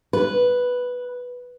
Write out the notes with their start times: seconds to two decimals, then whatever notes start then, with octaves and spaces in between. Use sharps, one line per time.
0.13 B4